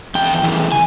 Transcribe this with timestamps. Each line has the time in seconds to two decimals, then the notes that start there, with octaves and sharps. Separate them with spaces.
0.15 E2 G5
0.43 C#3 E3
0.72 G#5